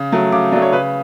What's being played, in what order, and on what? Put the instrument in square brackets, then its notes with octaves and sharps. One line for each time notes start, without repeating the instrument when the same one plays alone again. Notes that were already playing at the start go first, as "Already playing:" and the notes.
Already playing: [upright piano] C#3
F#3 A3
C#3 D6
F#3 D5
A3
C#5
C#3 B4